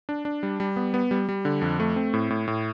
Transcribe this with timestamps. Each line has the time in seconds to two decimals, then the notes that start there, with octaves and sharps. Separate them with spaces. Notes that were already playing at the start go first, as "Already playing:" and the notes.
0.09 D4
0.25 D4
0.43 G3
0.60 G3
0.76 B3
0.94 B3
1.11 G3
1.29 G3
1.45 D3
1.62 F2
1.80 A3
1.96 C4
2.14 A2
2.30 A2
2.48 A2